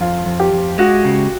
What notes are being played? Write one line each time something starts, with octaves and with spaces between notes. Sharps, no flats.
F2 F4
F2
G4
F2
G#3 F#4
C#3